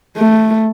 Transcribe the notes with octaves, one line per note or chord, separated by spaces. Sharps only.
A3